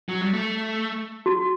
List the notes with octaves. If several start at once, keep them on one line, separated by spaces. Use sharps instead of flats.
F#3
G3
A3
F#4